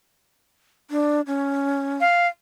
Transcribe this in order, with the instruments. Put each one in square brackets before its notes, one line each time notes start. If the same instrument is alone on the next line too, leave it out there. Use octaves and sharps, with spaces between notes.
[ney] D4
C#4
[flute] F5